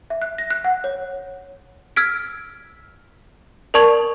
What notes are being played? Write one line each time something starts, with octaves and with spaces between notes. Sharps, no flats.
E5
F#6
A#6
F#6
F#5
C#5
E6 F6 G#6 B6 D7
A#4 D5 A5 C#6 G#6 F7